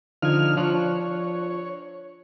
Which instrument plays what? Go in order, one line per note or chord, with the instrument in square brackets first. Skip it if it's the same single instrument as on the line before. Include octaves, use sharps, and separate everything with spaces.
[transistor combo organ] D3 D#4 F6 [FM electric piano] F3 G#6
[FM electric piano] F3 D4 F#6 [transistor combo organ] C#5